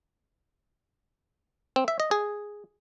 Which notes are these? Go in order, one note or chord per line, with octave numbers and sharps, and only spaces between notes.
C4
E5
D#5
G#4